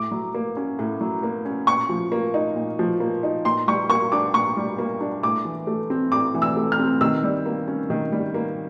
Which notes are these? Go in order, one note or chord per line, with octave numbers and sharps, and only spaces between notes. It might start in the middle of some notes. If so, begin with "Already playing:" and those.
Already playing: A2 D6
F#3
A#3
C#4
A2
F#3
A#3
C#4
A#2 C#6
F3
A#3
D#4
A#2
F3
A#3
D#4
A#2 C6
G3 C#6
A#3 C#6
D4 D6
A#2 C#6
G3
A#3
D4
A2 D6
E3
A3
C4
A2 D6
E3
E6
A3
F6
C4
D#3 E6
G3
A#3
C#4
D#3
G3
A#3